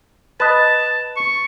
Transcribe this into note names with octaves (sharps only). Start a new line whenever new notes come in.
B4 D#5 A5
C#6